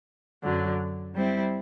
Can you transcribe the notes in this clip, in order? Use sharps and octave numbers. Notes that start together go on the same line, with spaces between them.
F#2 D3 F#3
G3 C4 E4